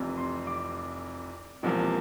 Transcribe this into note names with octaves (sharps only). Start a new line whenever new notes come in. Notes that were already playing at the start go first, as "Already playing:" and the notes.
Already playing: F1 F2 C3 E3
C6
D6
E1 E2 C3 F3 A#3